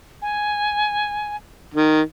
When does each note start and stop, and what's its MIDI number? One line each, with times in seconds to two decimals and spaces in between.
0.22 1.36 80
1.74 2.00 51